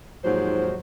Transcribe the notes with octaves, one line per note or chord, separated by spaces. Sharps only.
D#2 G#2 F3 F#3 C5